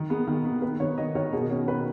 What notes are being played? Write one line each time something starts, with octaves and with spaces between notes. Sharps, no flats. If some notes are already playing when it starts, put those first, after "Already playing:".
Already playing: D#3
B3 G#4
D#3
B3
B3 B4
D#3 C#5
D#3 D#5
D#3 C#5
B2 G#4
C#4
B2 B4